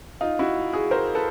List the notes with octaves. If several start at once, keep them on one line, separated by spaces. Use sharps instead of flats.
D#4 F4
E4 F#4
F#4 G#4
A#4 C5
A4 B4